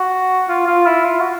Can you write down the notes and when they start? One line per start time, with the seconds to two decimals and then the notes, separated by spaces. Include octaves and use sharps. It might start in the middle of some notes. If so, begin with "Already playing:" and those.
Already playing: F#4
0.49 F4
0.67 F4
0.86 E4
1.05 F4
1.20 F#4